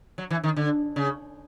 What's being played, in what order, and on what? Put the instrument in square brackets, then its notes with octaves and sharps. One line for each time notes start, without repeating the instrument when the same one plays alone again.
[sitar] F#3
E3
D#3
D3
C#3